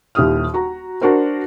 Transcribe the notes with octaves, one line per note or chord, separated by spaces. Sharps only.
D#1 D#2 E4 G4 D#6 F6
F#4 A#5
D4 F#4 A#4 C5